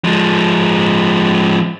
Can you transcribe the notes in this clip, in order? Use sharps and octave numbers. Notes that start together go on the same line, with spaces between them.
F3 G#3